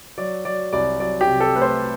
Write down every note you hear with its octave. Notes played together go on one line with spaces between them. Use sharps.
F#3 D5
F#3 D5
C2 D5
F#3 D5
G4
C3
A4
A3 B4
C5